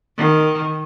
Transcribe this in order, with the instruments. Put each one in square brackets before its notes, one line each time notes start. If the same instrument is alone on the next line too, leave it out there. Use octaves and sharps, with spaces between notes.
[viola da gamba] D#3